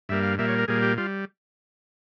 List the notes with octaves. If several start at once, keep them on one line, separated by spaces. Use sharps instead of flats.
G2 G3 A#3 E5
F5
A#2 G3 A#3 E5
C#5
A#4
A#2 G3 A#3 G#4
G4
G3 F4